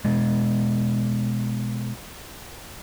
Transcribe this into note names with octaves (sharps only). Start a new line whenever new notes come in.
B2 G#3